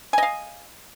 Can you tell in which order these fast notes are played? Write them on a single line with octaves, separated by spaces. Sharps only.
G#5 D#5 F5